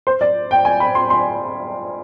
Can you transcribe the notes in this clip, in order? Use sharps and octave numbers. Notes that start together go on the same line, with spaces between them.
C5
D5
G5
G#5
B5
C6
C6